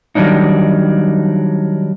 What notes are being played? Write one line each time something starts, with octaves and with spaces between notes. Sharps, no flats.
D#3 F#3 G3 D4 D#4